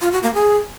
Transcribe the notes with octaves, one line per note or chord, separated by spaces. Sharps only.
F4
F#4
A#3
G#4